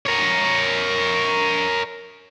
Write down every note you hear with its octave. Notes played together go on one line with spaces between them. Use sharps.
A#4 C#5